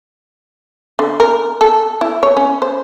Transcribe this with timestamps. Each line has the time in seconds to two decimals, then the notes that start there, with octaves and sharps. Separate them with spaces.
0.99 D3
1.20 A#4
1.61 A4
2.01 E4
2.23 C#5
2.37 C#4
2.62 C5